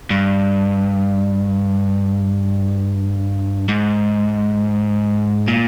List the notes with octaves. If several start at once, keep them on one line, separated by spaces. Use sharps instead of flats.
G2
G#2
A#2